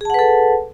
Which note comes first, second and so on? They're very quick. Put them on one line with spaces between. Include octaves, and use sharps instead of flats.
G#4 A5 F#5 B4 A4